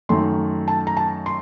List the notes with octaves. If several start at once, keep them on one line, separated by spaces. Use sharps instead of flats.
F#2 D#3 A3 C6
A5
A#5
A5
C6